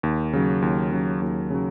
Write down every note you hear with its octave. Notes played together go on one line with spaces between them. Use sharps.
D#2
C#3 F#3
D#2
C#3 F#3
D#2
C#3 F#3